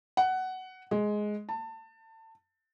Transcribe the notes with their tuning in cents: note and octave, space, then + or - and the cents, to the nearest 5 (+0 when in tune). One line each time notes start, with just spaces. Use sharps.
F#5 +15
G#3 +10
A5 +25